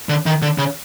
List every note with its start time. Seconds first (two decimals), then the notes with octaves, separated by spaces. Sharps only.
0.09 D3
0.26 D#3
0.42 D3
0.58 C#3